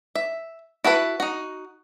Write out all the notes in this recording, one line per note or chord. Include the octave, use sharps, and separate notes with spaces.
E5
E4 F#4 A4 B4
D#4 F#4